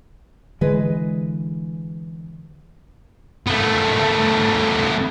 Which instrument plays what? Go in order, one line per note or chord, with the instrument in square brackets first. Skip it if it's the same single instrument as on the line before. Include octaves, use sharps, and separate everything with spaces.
[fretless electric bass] D3 E3 G#3 [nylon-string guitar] G#4 B4 D#5
[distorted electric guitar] A3 B3